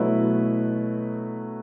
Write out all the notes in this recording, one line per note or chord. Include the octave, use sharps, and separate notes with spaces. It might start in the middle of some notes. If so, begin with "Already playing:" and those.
Already playing: B2 F#3 A3 E4 B4